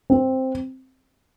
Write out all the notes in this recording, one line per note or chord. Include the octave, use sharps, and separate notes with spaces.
C4